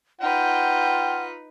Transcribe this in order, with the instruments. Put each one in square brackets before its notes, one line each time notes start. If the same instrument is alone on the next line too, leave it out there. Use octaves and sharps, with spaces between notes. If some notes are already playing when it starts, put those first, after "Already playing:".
[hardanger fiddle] D#4 B4 [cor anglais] F4 [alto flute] F#5 [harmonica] G5